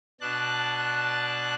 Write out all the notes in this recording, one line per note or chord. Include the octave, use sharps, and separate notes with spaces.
B2 D4 A5 F#6